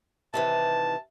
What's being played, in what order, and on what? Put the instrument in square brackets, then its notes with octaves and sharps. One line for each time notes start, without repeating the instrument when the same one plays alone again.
[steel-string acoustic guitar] C3 D#3 E3 [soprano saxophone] A5